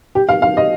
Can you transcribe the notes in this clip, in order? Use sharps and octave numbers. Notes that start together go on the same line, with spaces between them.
G4
F5
F5
D#5